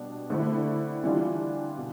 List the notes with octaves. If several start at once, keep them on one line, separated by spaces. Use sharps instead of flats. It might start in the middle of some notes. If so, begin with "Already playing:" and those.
Already playing: B2 G3 D4
D3 A3 C4 E4
E3 G3 D4 F4
B2